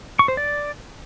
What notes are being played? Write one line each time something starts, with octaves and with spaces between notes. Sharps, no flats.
C#6
C5
D5